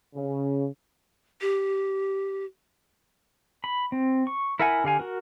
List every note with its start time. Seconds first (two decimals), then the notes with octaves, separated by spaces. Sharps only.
0.15 C#3
1.41 G4
3.64 B5
3.92 C4
4.27 C#6
4.59 E4 A#4 E5 F#5 G#5
4.84 D3 G4 F5 G#5
4.99 F#4 A#4